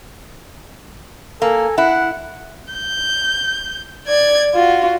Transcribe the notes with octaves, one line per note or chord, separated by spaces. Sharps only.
A#3 A4 G#5
E4 F#5
G6
D5 G#6
F4 F#4